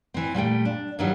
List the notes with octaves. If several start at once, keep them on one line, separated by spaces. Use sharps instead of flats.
E3 C4
A#2 G3 A3 G5
D4
G2 D#3 E3 F#3 G3